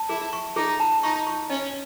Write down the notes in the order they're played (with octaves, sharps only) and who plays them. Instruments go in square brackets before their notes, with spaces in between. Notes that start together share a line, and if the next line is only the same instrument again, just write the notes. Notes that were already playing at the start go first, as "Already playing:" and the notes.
Already playing: [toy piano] A5
[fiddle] E4 [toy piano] G#4
[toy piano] C#6
[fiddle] D#4 [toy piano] G#4
[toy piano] A5
[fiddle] D#4 [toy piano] C#6
[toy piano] C#6
[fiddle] C#4 [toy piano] D#5